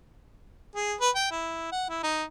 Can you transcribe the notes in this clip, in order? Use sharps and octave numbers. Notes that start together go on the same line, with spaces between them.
G#4
B4
G5
E4
F#5
E4
D#4